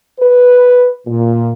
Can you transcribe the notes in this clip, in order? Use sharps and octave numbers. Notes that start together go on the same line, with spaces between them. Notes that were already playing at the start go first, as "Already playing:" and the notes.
B4
A#2